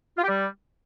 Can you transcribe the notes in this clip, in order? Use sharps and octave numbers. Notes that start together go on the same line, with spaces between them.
F4
G4
G3